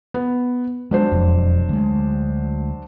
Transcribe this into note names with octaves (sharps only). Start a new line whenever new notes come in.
B3
F#3 G#3 D4 C5
E1 F2
D2 G#3